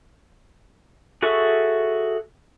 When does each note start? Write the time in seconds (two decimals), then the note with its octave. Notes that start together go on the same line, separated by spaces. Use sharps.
1.23 F#4 G#4 A4 E5 C#6